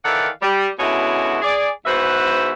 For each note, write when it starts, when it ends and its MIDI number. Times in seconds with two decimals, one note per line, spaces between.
0.05 0.28 51
0.05 0.28 52
0.05 0.28 69
0.05 0.28 74
0.05 0.28 77
0.05 0.28 78
0.42 0.67 55
0.79 1.39 47
0.79 1.39 50
0.79 1.39 56
0.79 1.39 61
0.79 1.39 64
0.79 1.39 66
1.42 1.69 68
1.42 1.69 74
1.86 2.53 40
1.86 2.53 44
1.86 2.53 66
1.86 2.53 71
1.86 2.53 72
1.86 2.53 76